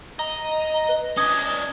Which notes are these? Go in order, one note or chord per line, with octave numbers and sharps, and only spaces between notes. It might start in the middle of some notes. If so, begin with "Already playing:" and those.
D#5 A#5
B4
C#4 D4 D#5 G#6